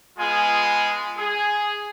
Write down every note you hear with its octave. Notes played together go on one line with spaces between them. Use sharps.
G#3 B3 F4 G#4 G#5
G#4